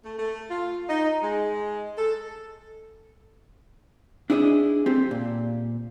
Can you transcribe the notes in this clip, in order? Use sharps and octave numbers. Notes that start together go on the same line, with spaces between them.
A3
A3
F4
D#4
G#3
A4
D4 E4 G#4 C#5 D#5
C4 G4 A4
A#2